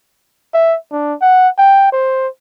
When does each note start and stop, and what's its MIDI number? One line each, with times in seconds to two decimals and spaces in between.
0.54 0.77 76
0.91 1.14 62
1.21 1.48 78
1.58 1.88 79
1.92 2.28 72